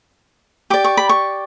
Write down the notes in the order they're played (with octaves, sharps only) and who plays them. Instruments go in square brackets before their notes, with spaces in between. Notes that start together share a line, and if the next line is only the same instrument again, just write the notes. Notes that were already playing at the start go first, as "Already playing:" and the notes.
[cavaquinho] G4 D5 D6
C#6
B5
C#6